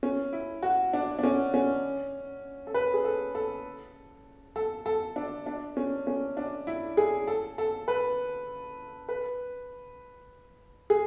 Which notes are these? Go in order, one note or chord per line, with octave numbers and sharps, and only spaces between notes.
C#4
E4
F#4
D4
D4
C#4
C#4
A4
B4
G#4
A4
A4
A4
A4
D4
D4
C#4
C#4
D4
E4
G#4
A4
A4
B4
B4
G#4